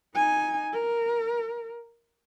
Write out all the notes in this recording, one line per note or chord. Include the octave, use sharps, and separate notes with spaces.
D#4 G#5
A#4